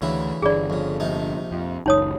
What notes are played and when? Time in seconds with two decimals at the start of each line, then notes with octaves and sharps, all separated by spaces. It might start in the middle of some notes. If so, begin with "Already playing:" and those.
0.02 D2 C#3 E3 E4
0.42 G1 D3 G#4 D5
0.70 F2 C#3
1.00 A#1 C3 D#4
1.52 F2
1.86 F#1 C#2 D#4 C#5 D#6